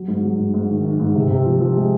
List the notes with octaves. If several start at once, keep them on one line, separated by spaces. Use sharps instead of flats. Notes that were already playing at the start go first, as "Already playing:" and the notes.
Already playing: F#3
G#2
F#3
G#2
G#2
D#3
D#3
G#2
C3
C3
F3
F3
G#3